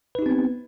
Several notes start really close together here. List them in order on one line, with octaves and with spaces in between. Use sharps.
B4 D#4 G4 C4 B3